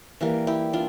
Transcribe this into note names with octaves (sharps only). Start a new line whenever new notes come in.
E3 G3 A#3
E4 G4
D4 F4